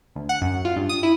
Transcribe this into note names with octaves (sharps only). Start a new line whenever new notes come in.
D2
F#5
F#2
F4
G2
D#6
E4